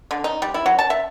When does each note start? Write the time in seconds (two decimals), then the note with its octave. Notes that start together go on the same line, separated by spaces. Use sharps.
0.11 D3
0.24 D#4
0.42 G3
0.54 E4
0.66 F#3
0.79 A5
0.90 E5